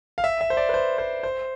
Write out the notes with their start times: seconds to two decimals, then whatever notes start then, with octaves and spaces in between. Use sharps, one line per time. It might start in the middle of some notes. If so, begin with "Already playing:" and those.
0.18 F5
0.24 E5
0.41 E5
0.50 C5
0.57 D5
0.69 B4
0.74 C5
0.98 C5
1.23 C5